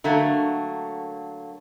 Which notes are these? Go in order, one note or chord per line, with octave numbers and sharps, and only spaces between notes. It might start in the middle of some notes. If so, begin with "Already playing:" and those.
D3 F#3 A3 A#3